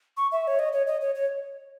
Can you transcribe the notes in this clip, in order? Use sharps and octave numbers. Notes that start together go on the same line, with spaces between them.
C#6
E5
C#5
D#5
C#5
D#5
C#5
C#5